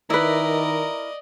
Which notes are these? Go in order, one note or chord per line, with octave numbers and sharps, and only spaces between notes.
D#3 E4 A#4 B4 D5 D#5